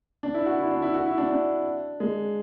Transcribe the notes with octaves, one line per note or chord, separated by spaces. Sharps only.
D4
E4
F#4
E4
D4
E4
F#4
E4
D4
D4
G#3